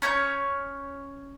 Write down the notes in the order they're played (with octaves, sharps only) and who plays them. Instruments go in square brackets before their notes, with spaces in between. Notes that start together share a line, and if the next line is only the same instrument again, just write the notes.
[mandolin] C#4 C#5 A#5 G6